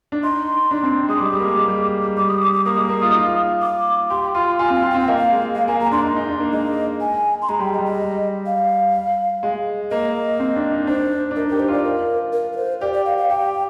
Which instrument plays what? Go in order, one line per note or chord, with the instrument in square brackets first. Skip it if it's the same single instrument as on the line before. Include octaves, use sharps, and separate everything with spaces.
[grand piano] D4
[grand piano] D#4 [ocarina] C6
[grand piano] D4
C4
[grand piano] G#3 [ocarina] D#6
[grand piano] G3 [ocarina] D6
[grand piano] G3
A#3
G#3
G#3
G3
[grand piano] G3 [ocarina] D6
[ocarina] D#6
D6
D6
[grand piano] A#3 [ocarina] D#6
[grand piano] G#3
A#3
F4
D#4
F4
[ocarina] D6
[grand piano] G4 [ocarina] C6
[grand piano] F4 [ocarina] C6
[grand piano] F4 [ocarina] G#5
[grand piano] C4
[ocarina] G5
[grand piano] F4
[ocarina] G5
[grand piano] C4
[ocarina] F5
[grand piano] A#3 [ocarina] D#5
[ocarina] F5
[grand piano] G#3
[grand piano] G#3 [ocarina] F5
[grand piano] A#3 [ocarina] G#5
[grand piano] A#3 [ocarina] A#5
[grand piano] D4 [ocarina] C6
[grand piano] D#4
D#4
D4
A#3
[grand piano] G#3 [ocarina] D#5
[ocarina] G#5
C6
[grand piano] G#3 [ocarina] A#5
[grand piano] G3 [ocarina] G5
[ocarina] D#5
[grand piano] G3
[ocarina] D#5
F5
[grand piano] G#3
[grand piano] A#3 [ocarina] D#5
[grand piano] C4
D4
D#4
[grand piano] D4 [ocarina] C5
[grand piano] D4
[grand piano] D#4 [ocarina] A#4
[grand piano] G4 [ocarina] A#4
[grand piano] G4 [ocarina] C5
[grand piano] F4 [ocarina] D5
[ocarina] A#4
A#4
A#4
C5
[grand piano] G4 [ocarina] D5
[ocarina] D5
F5
F5
[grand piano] G4 [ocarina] G5